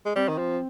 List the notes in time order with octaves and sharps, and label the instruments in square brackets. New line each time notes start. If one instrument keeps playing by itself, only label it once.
[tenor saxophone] G#3
[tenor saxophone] G3 [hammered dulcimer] C4
[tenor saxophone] D#3
F3